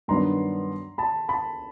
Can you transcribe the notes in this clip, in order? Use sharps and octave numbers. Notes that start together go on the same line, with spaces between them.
G2 D#3 F#3 B3 D4 A#5 C6
A5 B5
A5 B5